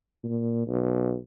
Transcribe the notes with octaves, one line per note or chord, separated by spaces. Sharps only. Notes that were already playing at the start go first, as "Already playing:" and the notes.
A#2
B1